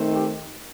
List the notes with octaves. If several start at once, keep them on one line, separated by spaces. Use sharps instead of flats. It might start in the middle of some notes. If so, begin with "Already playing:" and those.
Already playing: D#3 A3 C4 D#4
G4